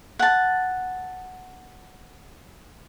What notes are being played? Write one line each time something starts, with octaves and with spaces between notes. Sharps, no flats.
F#5 A5